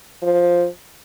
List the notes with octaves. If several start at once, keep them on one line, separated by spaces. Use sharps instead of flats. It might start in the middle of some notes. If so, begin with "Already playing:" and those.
F3